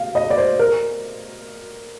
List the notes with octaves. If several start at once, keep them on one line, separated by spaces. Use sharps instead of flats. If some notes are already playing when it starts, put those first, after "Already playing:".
Already playing: F5
D#5
D5
C5
A#4